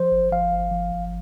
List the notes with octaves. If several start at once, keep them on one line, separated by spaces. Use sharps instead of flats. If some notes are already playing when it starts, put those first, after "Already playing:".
Already playing: F3 C5
G1
F3 F5
G1
F3
G1